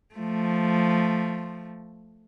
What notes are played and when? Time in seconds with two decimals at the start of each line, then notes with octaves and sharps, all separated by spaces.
0.14 F3 A3